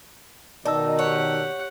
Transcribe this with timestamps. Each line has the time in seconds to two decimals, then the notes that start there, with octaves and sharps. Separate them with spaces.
0.65 B2 D#3 D#4 D5 A5 E6
0.99 G4 C#5 F#5